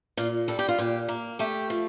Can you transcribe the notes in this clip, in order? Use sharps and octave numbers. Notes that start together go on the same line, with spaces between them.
A#2 F4
G3 A4
G4
F4
A#2 G4
A#3
A3 G4
F3